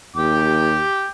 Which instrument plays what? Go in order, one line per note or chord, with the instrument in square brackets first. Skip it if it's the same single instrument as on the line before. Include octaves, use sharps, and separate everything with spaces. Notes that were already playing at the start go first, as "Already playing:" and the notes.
[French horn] D#2 [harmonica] G5 D6